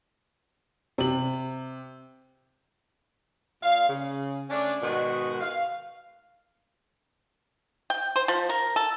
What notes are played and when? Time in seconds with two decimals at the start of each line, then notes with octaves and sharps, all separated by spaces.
0.98 C3 F#7
3.63 A#2 F5
3.88 C#3
4.49 A3 C#4 D4
4.81 G#2 B2 D#3 G#3 F#4
5.41 F5
7.90 G5
8.16 C5
8.28 F3
8.49 A#4
8.76 A4